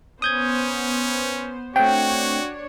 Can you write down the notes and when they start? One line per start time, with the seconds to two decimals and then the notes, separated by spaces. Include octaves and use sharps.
0.22 B3 C#4 C5 D#6 G6 G#6
1.76 A3 C4 D4 F#4 C#5 G5